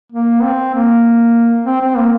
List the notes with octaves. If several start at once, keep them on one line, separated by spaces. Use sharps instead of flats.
A#3
C4
A#3
C4
C4
A#3